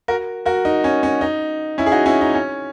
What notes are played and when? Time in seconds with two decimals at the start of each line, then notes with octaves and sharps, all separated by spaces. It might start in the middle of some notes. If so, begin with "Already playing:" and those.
0.08 F#4 A#4
0.46 F#4 A#4
0.65 D#4
0.84 C#4
1.03 C#4
1.21 D#4
1.78 C#4 E4
1.86 G#4
1.92 D#4 F#4
2.06 C#4 E4
2.21 D#4
2.34 C#4